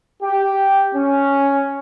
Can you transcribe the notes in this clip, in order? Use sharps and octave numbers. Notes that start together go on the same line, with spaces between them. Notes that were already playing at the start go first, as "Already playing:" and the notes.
G4
C#4